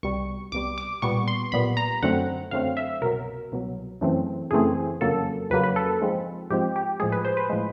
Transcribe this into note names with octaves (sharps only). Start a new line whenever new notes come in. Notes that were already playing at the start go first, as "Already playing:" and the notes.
C2 B2 G3 C#6
C2 B2 G3 D6
D6
B1 A#2 G3 B3 C#6
C6
B1 A#2 G3 B3 B5
A#5
F#2 D3 F#3 A3 C4 F#5
F#2 D3 F#3 A3 C4 F5
E5
C2 B2 F#3 A#4
C2 B2 F#3
F#2 C#3 E3 A3 C4
F#2 C#3 E3 A3 C4 G#4
F2 C#3 F#3 A#3 A4
F2 C#3 F#3 A#3 B4
B4
A4
G#2 F3 G#3 C4
G#2 F3 G#3 C4 G4
G4
A2 F3 G#3 G#4
B4
C5
B4
A2 F3 G#3